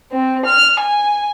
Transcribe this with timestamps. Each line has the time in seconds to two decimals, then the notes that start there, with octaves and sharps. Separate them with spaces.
0.12 C4
0.46 F6
0.79 G#5